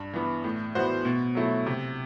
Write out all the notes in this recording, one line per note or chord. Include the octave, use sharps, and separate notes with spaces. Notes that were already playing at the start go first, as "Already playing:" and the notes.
Already playing: G2
E3 B3
A2
E3 B3 F#4 C5
B2
F#3 A3 E4
C3